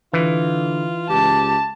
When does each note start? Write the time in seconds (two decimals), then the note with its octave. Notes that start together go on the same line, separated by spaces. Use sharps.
0.13 D3 E3 F4
1.10 C#2 G4 A5